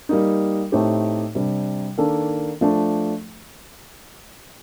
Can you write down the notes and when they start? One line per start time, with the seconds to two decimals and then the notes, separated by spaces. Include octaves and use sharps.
0.09 G3 A#3 D#4
0.72 A2 A3 C4 D#4 G4
1.35 C3 G3 D4
1.98 D#3 A#3 D4 A4
2.61 F3 A3 D4